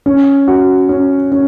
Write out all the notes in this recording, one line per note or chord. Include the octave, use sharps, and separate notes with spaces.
C#4
F#4
C#4
C#4